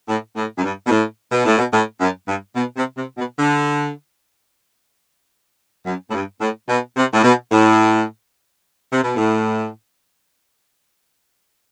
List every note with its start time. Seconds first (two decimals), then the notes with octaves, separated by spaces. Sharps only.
0.09 A2
0.36 A2
0.58 F#2
0.63 G2
0.87 B2
0.90 A2
1.32 B2
1.46 A2
1.58 B2
1.73 A2
2.01 F#2
2.28 G2
2.55 B2
2.77 C3
2.97 C3
3.18 B2
3.39 D3
5.86 F#2
6.10 A2
6.14 G2
6.41 A2
6.69 B2
6.97 C3
7.13 A2
7.24 B2
7.52 A2
8.93 C3
9.04 B2
9.17 A2